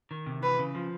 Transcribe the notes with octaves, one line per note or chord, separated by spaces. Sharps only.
D#3
C3
E3 B4
C#3
F3